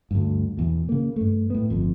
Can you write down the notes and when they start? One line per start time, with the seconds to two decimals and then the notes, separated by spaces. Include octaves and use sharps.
0.11 D2 G2
0.57 E2 B2
0.89 C#3 A#3
1.16 G2 A3
1.50 A2 B3
1.70 G1 F2